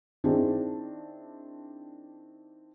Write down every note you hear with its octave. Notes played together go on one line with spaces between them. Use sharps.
D#3 C4 D4 E4 G#4